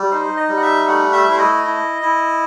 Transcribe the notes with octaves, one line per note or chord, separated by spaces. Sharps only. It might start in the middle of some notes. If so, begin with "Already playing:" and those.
Already playing: G3
D#4 C5
D#5
G3
F#5
E5
A3 F#5
E5
E4 C5
D#5
E4
E4